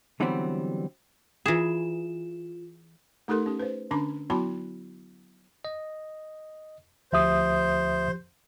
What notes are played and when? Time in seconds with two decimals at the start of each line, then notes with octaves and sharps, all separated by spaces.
0.20 D3 E3 F#3 G3 B3 C4
1.46 E3 F4 G#4 E7
3.28 A3 D#4 G4 A4 A#4 C6
3.46 C#4 G4
3.59 B4 C5
3.91 D3 C#4 D4 A#5 D6
4.30 F#3 B3 E4 F#4 A5 B5
5.65 D#5
7.12 D2 F3 G4 C5 E5 D#6